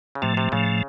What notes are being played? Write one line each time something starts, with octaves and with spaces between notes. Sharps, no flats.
C#3
A2 C3 F3 A3
C3
A2 C#3 F3 A3